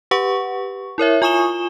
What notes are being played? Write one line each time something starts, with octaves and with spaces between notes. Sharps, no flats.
G4 B4 F#5 C#6
E4 A#4 C#5 E5
F4 G#5 C#6 D#6 E7 G7